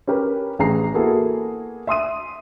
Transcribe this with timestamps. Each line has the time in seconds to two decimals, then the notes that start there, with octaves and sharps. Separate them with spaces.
0.07 C#4 G4 A#4 B4
0.59 A1 G#4 A#5 C7
0.94 A#3 B3 E4 F#4 G#4 A4
1.87 E5 C6 D#6 D#7